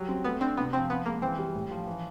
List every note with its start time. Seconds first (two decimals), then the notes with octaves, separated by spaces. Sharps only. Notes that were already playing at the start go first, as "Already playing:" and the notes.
Already playing: F#3 G3
0.08 C4
0.24 A3 B3
0.41 C4 D4
0.57 C3 B3
0.73 F3 C4
0.89 F3 B3
1.06 G#3 A#3
1.22 E3 C4
1.39 G3
1.55 A2
1.71 F3
1.87 E3